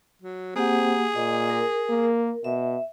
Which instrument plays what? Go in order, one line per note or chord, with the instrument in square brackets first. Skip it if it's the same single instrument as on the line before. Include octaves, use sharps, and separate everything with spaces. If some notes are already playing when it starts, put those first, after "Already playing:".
[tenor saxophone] F#3
[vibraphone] A#3 G4 F#5 [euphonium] C4 [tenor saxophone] G#4
[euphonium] A#2 [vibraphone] D#5
[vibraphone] A#4
[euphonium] A#3
[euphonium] B2 [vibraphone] E5